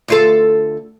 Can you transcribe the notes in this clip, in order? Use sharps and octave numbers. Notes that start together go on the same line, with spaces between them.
D2 F4 A4